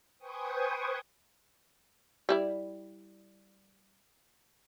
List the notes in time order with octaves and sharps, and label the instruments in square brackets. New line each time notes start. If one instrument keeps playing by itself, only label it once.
[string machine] B4 C5 G5 G#5 C#6 D#6
[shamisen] G3 E4 D5